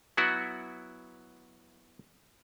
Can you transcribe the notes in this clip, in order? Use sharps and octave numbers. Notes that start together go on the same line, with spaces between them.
F#3 B3 E4 F#4 F#5